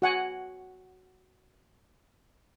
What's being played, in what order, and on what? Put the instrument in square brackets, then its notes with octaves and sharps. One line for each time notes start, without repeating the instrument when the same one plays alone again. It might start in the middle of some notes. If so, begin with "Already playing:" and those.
[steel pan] F#4 F#5 G#5